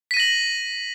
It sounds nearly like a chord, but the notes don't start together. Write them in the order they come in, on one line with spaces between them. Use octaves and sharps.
B6 D#7 A#6 F#7